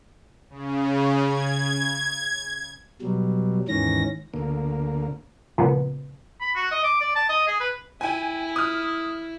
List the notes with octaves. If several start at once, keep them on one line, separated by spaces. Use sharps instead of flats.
C#3
G#6
B2 F#3 G3
D#2 G#2 D#3 E3 C#4 A#6
D2 A#3
C#2 A#2 F3 B3
B5
F#4
D#5
D6
D5
A5
D#5
G#4
B4
E4 G5 G#5
D#6 F6